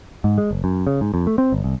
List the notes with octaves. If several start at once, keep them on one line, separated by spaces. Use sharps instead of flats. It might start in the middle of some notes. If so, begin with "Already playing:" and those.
G#2
G#3
F#1
F#2
C#3
G#2
F2
A3
C4
G1
C2